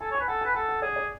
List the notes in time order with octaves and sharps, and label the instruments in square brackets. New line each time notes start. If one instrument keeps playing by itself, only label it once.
[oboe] A4 [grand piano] G#5
[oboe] C#5
[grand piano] G#5
[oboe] B4
[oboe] A4 [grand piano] F#5
[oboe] B4 [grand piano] G#5
[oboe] A4 [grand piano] F#5
[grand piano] F#5
[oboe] G#4 [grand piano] D5
[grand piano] D5